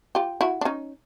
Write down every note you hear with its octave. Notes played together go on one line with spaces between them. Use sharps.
F4 G4
E4 F#4
D4
C#4 D#4